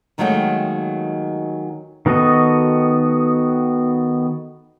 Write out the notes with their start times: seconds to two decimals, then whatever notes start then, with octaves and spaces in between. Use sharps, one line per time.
0.18 D#2 D#3 F#3 G#3 A3 G5
2.06 D#3 B3 F#4 A4 D#5